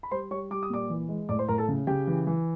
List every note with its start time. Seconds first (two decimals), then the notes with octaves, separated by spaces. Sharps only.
0.03 B5
0.11 G3 C5 C6
0.31 G3 C#5 C#6
0.51 G3 D6
0.63 D#6
0.70 A#2 D5 D6
0.90 E3
1.09 G#3
1.29 A2 D5 D6
1.39 C5 C6
1.48 A2 A#4 A#5
1.58 A4 A5
1.68 C#3
1.87 C#3 G4 G5
2.07 E3
2.27 E3